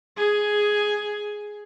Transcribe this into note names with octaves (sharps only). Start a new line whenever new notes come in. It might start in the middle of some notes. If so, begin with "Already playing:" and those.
G#4 G#5